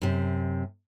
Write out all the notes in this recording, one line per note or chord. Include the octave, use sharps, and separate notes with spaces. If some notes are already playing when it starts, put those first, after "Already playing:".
F#2 C3